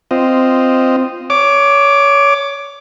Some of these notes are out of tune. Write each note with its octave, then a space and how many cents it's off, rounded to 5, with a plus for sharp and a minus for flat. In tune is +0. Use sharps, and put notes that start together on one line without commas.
C4 -10 F4 +0 D#5 -5
C#5 +20 D6 +0